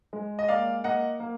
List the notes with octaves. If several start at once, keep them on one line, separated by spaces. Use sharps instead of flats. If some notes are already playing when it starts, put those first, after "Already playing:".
G#3
D#5
A#3 D5 F5
A#3 D#5 F#5
A#3